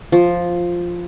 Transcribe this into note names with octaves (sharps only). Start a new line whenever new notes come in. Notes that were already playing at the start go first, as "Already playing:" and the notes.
F3